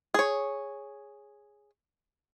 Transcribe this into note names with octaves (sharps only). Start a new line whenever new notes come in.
G#4 C#5